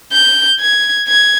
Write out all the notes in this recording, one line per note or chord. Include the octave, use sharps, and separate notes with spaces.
G6
G#6
G#6